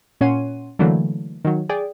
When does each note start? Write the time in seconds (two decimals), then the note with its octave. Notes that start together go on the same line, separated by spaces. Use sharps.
0.21 A#2 C#4 C#5 F#5 C6 D#7
0.79 D3 E3 F#3 A3 A#3
1.45 D#3 F#3
1.69 G#4 D5 G5